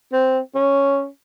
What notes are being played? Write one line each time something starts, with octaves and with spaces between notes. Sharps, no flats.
C4
C#4